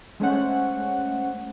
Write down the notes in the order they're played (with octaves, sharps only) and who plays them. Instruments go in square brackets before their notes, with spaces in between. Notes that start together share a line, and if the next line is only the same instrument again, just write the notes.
[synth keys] G#3 A3 C#4 C5 F#5